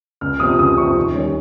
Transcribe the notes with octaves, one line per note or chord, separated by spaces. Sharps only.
C#2 F6
C3 F3 C4 D#6
C#2 D#6
C3 F3 C4 C#6
D#2
D#3 G3 C#4